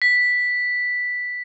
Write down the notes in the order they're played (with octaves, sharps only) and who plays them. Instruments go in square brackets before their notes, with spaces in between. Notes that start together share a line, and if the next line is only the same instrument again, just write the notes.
[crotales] B6